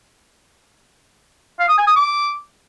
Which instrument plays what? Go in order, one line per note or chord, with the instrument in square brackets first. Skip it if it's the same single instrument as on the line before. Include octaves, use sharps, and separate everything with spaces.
[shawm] F5
D#6
G#5
D#6
D6